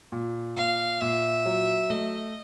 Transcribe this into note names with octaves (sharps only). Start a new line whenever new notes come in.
A#2
A#2 F5
A#2 E5
F#3
A3 D#5